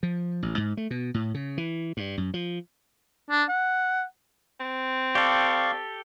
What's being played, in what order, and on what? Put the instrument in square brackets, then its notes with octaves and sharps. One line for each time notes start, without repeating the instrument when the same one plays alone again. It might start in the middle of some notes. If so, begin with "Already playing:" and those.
[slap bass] F3
A1
G#2
A3
B2
A2
C#3
E3
G2
F#2
F3
[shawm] D4
F#5
[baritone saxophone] C4
[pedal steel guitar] G4 A4 [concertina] D5 F5 C#6